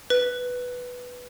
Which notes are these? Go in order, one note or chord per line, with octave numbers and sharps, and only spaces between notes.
B4